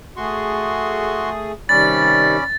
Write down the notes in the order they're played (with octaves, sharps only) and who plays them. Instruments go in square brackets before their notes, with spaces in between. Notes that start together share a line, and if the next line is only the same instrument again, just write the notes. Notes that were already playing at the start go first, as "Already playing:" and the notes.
[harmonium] A3 G#4 [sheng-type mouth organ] F#4 C6 C#6
[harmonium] C3 D#3 G3 [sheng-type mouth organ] C#4 D5 B5 [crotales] A6